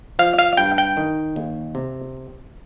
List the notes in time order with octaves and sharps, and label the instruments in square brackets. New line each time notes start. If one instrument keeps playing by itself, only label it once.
[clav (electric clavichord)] F3 F5
F5
G2 G5
G5
D#3
D#2
C3